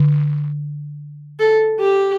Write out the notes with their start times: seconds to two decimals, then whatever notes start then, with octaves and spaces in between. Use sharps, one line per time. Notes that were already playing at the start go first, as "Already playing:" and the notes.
Already playing: D3
1.39 A4
1.80 G4